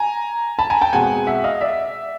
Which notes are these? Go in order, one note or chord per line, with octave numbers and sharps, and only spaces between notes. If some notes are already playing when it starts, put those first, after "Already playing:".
Already playing: G#5 A#5
A5 B5
G#5 A#5
G5 A5
B2 G#3 C4 F#5 G#5
E5 F#5
D#5 F5
D5 E5